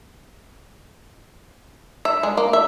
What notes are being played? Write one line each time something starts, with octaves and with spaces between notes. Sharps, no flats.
E5
G#3
A#3
E5